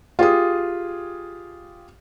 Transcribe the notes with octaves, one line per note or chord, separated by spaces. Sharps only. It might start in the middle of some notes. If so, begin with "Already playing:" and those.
F4 G4 G#4 D#6